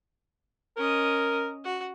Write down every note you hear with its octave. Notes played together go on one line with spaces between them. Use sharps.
C#4 A#4 D#5
F#4